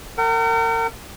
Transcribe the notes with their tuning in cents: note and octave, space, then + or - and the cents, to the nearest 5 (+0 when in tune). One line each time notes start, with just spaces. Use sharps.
A#4 -35 F#5 +40